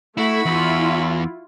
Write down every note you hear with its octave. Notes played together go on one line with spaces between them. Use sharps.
A3 E4 F#4 B5
E2 E4 F4